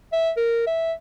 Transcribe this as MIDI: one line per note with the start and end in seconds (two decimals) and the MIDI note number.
0.12 0.31 76
0.37 0.65 70
0.67 0.93 76